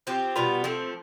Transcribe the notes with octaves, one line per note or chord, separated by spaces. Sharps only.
F3 C4 G4
B2 G3 B3 F4
F3 A3 C4